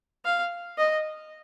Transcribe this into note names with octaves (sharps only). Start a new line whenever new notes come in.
F5
D#5